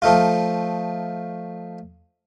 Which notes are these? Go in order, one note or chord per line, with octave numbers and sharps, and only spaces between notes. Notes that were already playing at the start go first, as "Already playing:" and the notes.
F3 A3 D#4 F4